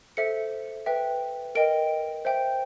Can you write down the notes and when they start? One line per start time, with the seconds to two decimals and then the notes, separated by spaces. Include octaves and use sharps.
0.17 A4 C5 E5 C#7
0.86 B4 E5 G5
1.55 A#4 D#5 G5 D7
2.25 C5 E5 G5